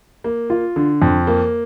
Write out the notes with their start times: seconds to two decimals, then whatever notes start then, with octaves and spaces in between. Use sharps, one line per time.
0.24 A#3
0.50 F4
0.76 D3
1.02 F2
1.27 A#3